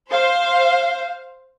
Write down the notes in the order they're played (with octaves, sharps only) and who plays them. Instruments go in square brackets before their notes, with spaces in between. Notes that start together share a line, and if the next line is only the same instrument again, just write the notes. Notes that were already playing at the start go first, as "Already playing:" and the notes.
[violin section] C5 [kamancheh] F5